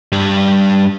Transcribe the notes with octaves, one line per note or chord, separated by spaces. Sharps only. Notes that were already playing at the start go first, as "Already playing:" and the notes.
G2 G3